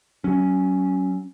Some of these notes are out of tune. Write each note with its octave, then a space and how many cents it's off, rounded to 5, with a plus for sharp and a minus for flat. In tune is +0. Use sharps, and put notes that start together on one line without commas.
F#3 +20 C#4 +0